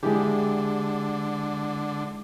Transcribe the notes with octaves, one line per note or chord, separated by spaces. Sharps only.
D3 G#3 E4 G4